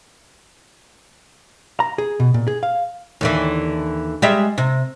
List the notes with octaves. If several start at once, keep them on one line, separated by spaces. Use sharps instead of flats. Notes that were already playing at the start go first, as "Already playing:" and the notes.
A#5
G#4
B2
A#2
G#4
F5
D#2 D3 E3
G3 G#3 E5
C3